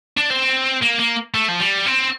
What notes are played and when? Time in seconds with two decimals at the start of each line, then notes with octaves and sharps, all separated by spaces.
0.17 D4
0.30 C4
0.82 A#3
0.99 A#3
1.34 A3
1.49 F3
1.60 G3
1.86 C4